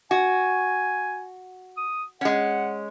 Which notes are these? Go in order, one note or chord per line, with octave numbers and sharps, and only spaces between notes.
F#4 G#5
D#6
G#3 C#4 F#5